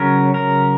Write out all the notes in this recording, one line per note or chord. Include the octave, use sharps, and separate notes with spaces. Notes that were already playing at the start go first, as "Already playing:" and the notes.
Already playing: C#3 F#3 C#4 A#4
A#4